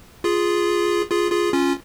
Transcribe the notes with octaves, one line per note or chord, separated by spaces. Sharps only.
F4 G#4
F4 G#4
F4 G#4
C#4 F4